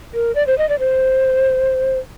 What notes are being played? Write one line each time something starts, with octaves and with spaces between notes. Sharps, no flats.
A#4
D5
C5
D#5
D5
C5